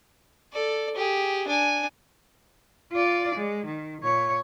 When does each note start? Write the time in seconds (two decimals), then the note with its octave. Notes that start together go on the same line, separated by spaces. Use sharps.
0.52 A4 D5
0.95 G4 G#4
1.47 D4 G#5
2.92 F4 D5
3.35 G#3
3.66 D#3
4.02 A#2 C#5